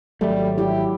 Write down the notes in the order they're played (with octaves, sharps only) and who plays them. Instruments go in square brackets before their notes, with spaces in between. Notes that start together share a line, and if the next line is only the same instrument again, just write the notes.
[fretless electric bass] G#1 A3 [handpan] F#3 [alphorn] G3
[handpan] E4 [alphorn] G4